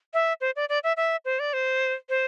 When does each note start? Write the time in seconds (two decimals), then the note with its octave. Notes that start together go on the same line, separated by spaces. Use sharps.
0.14 E5
0.41 C5
0.56 D5
0.69 D5
0.84 E5
0.97 E5
1.25 C5
1.39 D5
1.53 C5
2.09 C5